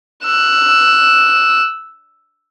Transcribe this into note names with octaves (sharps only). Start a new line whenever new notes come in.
E6 F#6